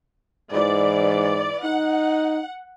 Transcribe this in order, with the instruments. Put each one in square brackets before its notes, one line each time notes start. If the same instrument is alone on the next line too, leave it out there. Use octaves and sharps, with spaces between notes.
[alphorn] G#2 [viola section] E3 D5
[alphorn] D#4 [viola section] F#5